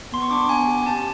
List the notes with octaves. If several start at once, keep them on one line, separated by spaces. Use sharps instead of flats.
B3 C6
C#6
D4 D6
B3 G#5
G4
C#4 A5